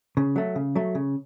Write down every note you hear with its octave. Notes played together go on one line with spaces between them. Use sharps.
C#3
F#3 A3
C#3
F#3 A3
C#3